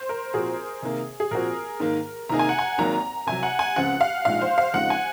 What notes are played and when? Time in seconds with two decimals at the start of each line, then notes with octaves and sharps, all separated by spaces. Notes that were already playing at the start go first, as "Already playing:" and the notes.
Already playing: C5
0.09 A#4
0.34 A#2 F3 C4 F#4 G#4
0.82 C3 D#3 A#3
1.20 G#4
1.31 A#2 F3 C4 F#4 A#4
1.80 G#2 D#3 A#3
2.29 C3 D#3 A#3 D#4 G#4 A#5
2.39 G#5
2.49 F#5
2.59 G#5
2.78 G#1 G#2 F#3 A#3 A#5
3.26 C2 C3 F#3 G#5
3.43 F#5
3.59 G#5
3.76 C#2 C#3 F3 C4 F4 F#5
4.01 F5
4.25 A#1 A#2 F3 G#3 D#4 F5
4.42 C5
4.58 F5
4.73 F2 C#3 F3 G#3 D#4 F#5
4.90 G#5